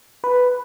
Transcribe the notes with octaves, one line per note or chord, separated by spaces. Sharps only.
B4